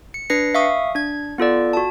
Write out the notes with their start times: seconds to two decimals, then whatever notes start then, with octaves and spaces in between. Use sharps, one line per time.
0.14 C#7
0.30 D4 B4 A#6 C7 C#7
0.54 E5 F5 C#6 D#6
0.95 D4 G#6
1.38 B3 F4 A4 D5
1.73 F#4 A5